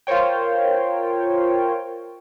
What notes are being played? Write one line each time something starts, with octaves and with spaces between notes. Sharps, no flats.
F4 A#4 C5 C#5 G5